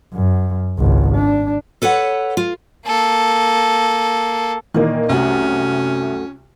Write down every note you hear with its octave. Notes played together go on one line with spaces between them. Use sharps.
F#2
G#1 C#2
D4
A4 B4 C#5 F#5
F4
A#3 A4
A#2 D#3 E3 A#3 D#5
C2 F#2 A3 C#4 F#4